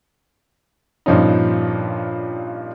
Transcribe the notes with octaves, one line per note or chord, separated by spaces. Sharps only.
G2 A#2 F3 C#4 D#4